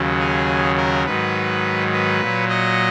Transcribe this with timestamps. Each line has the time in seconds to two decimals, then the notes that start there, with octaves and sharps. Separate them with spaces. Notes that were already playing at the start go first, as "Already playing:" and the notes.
Already playing: D#2 C#3 F#3
0.19 G#4
0.77 A#4
1.06 G#2 D#3 F#3 B4
1.92 B4
2.21 A#2 F#3
2.50 D#5